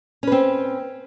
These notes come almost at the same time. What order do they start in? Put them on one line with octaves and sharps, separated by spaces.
C#4 B4 C4